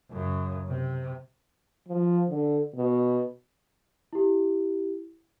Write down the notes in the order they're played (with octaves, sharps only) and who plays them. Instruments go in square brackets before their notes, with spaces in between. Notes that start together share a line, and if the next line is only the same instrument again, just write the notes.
[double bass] F#2 C#3
C3
[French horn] F3
D3
B2
[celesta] E4 G4